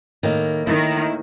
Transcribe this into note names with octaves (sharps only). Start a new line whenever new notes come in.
A2 D#3 A#3 D#5
D#3 E4